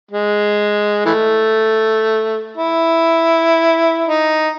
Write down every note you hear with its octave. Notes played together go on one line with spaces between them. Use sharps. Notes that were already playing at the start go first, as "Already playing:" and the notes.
G#3
E3 A3
E4
D#4